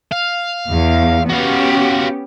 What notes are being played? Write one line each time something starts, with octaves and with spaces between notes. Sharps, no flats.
F5
E2
B3 C#4 F#4 G4 F5